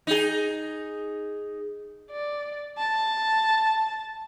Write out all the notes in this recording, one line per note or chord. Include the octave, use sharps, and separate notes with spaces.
D#4 G#4
D5
A5